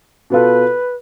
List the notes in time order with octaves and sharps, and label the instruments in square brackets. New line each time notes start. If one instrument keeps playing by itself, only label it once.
[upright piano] B2 B3 F4 A4 [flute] B4